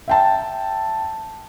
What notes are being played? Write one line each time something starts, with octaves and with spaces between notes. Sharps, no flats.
E5 G5 A5